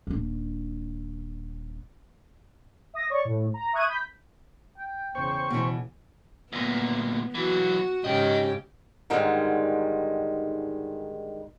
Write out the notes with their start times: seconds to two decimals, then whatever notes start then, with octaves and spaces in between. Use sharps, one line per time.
0.07 D#1 D4
2.94 E5 D#6 A#6
3.10 C#5 D5 C#6
3.25 A2
3.54 A#5
3.73 E5 C#6 D#6 F#6 G#6 D#7
3.87 B5 G6 B6
4.78 G5
5.15 E2 C#3 C5 C#6
5.50 B2 E3
6.53 D2 A#2 B3
7.35 E3 F#3 F#4
8.04 G#2 C#3 G4 D#5 G5
9.10 G#2 D3 D#3 G3 G#3